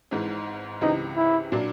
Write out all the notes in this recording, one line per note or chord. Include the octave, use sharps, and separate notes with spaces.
G#1 G#2 E3 G#3
C#2 C3 E3 D#4
E4
A#2 F#3 A#3 D4